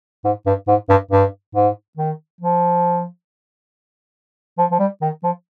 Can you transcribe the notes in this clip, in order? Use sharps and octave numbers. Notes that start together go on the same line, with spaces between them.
G#2
G2
G#2
G2
G2
G#2
D#3
F3
F3
F3
G3
D#3
F3